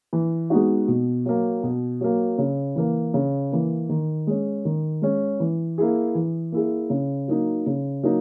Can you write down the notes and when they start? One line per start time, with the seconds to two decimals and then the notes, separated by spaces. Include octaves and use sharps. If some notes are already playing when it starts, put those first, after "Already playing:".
0.13 E3
0.50 G#3 B3 D#4 F#4
0.88 B2
1.26 F#3 A#3
1.63 B2
2.01 F#3 A#3
2.38 C#3
2.76 E3 A#3
3.14 C#3
3.52 E3 A#3
3.89 D#3
4.27 G#3 C#4
4.65 D#3
5.02 G#3 C#4
5.40 E3
5.78 A#3 E4 G#4
6.15 E3
6.52 A#3 E4 G#4
6.90 C#3
7.28 F#3 A#3 D#4
7.66 C#3
8.03 F#3 A#3 D#4